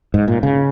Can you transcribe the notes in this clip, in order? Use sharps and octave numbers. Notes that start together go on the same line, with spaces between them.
G#2
A#2
C#3